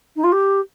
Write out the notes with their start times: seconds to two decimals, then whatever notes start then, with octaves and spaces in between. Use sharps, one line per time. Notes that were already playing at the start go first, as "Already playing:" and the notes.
0.16 D#4
0.24 F4
0.32 G4